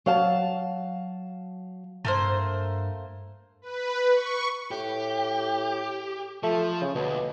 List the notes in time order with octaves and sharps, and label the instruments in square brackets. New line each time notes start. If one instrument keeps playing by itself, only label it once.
[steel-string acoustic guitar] F#3 F5 A5
[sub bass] G2 [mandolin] A3 A#3 C5
[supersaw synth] B4
C#6
[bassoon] A2 [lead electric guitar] G4
[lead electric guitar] F3 [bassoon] A3
[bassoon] C#3
[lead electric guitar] D2 [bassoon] B2